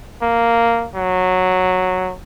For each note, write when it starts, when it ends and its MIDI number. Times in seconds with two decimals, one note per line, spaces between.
0.22 0.88 58
0.95 2.14 54